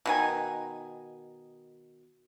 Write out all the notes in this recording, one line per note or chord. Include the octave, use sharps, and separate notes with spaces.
B2 D#3 G#5